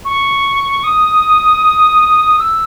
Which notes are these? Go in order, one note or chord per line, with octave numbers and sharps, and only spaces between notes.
C#6
D#6
E6